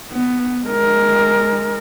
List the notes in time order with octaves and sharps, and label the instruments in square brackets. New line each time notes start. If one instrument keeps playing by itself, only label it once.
[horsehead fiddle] B3
G#3 A#4